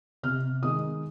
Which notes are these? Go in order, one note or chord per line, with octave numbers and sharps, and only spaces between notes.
C3 F6
D#3 G#3 D#4 D#6